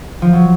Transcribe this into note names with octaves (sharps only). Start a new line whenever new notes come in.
F3
F#3